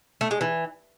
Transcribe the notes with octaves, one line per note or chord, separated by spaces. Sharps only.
A3
G#3
E3